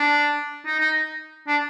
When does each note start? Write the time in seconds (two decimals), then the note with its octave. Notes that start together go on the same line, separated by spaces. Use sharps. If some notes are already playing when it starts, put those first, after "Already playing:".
Already playing: D4
0.65 D#4
0.80 D#4
1.47 D4